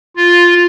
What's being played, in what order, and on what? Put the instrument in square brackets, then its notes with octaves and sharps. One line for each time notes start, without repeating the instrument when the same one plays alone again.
[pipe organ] F4